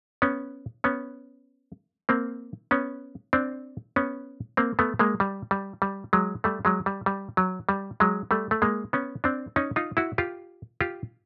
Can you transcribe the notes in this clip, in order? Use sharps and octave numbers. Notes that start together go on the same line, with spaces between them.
B3 C#4
B3 C#4
A#3 C4
B3 C#4
C4 D4
B3 C#4
A#3 C4
A3 B3
G#3 A#3
G3
G3
G3
F#3 G#3
G3 A3
F#3 G#3
G3
G3
F#3
G3
F#3 G#3
G3 A3
A3
G#3 A#3
B3 C#4
C4 D4
C#4 D#4
D#4 F4
E4 F#4
F4 G4
F4 G4